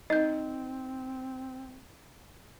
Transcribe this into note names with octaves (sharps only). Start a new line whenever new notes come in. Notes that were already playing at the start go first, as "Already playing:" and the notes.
C4 D#4 D#5 G6